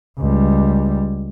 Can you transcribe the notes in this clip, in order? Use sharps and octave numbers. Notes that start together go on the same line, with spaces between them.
C#2 G3